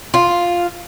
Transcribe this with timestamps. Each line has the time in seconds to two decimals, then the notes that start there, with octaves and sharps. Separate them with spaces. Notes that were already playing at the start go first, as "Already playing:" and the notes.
0.14 F4